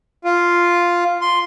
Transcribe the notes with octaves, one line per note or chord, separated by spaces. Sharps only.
F4
C6